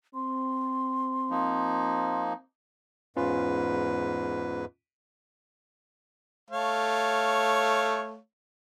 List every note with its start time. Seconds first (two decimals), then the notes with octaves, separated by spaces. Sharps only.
0.14 C4 C6
1.30 F3 A#3 D#4
3.17 E2 G#2 C#4 F4 B4
6.50 A3 C#5 F5